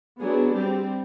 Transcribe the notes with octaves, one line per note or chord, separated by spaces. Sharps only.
F#3 B3 D4 G#4
G3 C4 G4